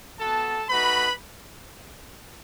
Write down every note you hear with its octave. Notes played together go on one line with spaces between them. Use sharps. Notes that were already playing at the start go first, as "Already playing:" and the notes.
B3 F#4 A4 A5
A3 D#4 F#4 B4 B5